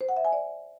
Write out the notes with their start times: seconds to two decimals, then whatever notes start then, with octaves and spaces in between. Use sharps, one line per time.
0.01 C5
0.09 F#5
0.17 E5
0.25 G#5
0.33 D5